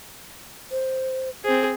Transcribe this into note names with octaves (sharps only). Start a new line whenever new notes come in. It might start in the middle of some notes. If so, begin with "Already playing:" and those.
C5
C4 G#4 C5